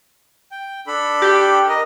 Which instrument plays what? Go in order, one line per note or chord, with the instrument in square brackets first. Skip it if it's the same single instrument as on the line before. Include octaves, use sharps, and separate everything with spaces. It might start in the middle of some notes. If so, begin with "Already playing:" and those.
[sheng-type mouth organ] G5
D4 A4 B5
[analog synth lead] G4
[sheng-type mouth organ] A#4 D#5